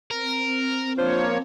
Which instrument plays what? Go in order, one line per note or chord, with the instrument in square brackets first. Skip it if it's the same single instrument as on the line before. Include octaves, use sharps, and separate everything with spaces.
[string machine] C4 [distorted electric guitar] A#4
[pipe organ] F3 A#3 C#5 [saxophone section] D4 F4 C5